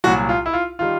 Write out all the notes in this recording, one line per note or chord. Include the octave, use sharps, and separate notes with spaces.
C2 A#2 F#3 F#4
F4
E4
F4
D#3 G3 F4